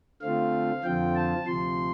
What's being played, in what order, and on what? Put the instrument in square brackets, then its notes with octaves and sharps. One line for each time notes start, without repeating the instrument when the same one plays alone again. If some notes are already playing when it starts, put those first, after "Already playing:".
[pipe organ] D3 A3 C4 F4 F5
F2 D3 F3 C4 F4 G5
A5
D2 C3 F3 C6